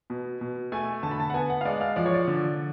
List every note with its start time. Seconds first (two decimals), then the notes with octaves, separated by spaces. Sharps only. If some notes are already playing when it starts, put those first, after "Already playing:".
0.10 B2
0.41 B2
0.72 A3 G#5
1.03 D3 A5
1.11 B5
1.20 A5
1.30 F#5
1.34 B3 G#5
1.50 F#5
1.61 F5
1.65 G#3 D5
1.81 F5
1.96 F3 D5
2.06 C#5
2.14 D5
2.28 D3